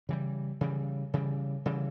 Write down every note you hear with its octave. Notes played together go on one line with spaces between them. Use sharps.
C#3 E3 G3
C#3 E3 G3
C#3 E3 G3
C#3 E3 G3